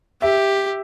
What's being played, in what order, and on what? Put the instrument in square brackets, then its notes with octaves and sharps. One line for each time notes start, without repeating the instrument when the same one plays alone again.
[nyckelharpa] G4 [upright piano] E5